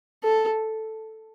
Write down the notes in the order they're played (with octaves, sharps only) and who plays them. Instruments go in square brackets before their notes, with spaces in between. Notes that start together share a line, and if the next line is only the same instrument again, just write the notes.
[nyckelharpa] A4